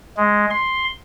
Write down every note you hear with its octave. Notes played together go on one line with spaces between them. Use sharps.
G#3
C6